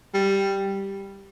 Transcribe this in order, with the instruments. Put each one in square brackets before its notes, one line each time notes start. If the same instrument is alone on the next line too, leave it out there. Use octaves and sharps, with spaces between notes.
[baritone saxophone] G3